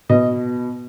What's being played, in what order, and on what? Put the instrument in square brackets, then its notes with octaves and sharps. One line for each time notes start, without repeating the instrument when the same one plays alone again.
[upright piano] B2 D#5